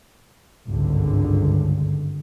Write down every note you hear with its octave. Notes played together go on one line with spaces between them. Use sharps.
G#1 C#2 G2 D3